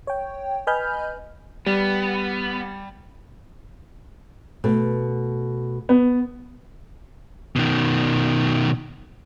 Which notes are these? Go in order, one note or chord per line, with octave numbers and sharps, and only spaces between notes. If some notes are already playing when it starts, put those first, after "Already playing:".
C#5 G5
B4 D#5 G#5 B5 F6 G6
G3 B3
B2 A3
B3
B2 D#3